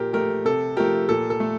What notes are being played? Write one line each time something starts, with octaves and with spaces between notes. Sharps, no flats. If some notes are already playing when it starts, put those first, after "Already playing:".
Already playing: A#2 G4 A#4
A3 G4 A#4
C3 A4
F3 A3 G4 A#4
A#2 A4
A4
A3